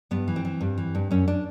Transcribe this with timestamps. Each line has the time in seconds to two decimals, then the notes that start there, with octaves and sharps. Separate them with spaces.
0.11 G2 B3
0.28 E3
0.36 C4
0.45 E3
0.61 G2
0.78 E3
0.95 G2
1.11 F#2 C#4
1.28 D4